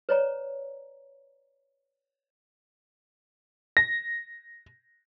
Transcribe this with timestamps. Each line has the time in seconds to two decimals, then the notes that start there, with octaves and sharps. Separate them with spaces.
0.09 B4 C#5 D5 A#5
3.77 A#6